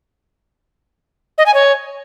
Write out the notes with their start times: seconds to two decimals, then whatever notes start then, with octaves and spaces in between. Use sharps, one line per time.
1.38 D#5
1.46 G#5
1.54 C#5